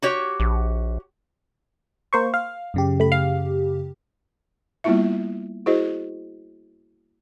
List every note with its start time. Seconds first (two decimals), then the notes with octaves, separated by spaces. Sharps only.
0.02 F#4 G4 C#5
0.40 A#1
2.13 A#3 C5 C#6
2.34 F5
2.74 F#2 C#3 G4
3.00 A3 B5
3.12 F5
4.84 G3 A#3 B3 E4 F4 E5
5.66 E4 F#4 G#4 C5 D#5